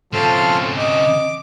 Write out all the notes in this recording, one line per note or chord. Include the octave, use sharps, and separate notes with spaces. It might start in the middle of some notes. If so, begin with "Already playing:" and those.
C#3 F3 C4 A4 C6 F6
D#5 D6